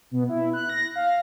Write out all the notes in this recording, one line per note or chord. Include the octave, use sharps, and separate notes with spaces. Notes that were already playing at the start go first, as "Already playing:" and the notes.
B2
E4
F#6
A#6
F5